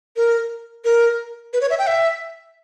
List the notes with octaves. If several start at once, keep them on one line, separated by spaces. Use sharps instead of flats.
A#4
A#4
B4
C#5
E5
G5
E5